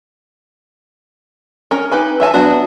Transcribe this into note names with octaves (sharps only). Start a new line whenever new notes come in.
C#4 A#4
D#4 G4 B4 G#5
E3 E5 G#5 A5
F#3 B3 D4 F#4